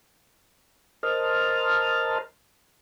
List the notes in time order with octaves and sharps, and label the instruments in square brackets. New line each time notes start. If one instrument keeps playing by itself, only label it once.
[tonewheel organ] A#4 C5 D#5 A5 F6